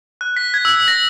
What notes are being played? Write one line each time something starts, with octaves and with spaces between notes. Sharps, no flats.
F#6
B6
G#6
E6
A#6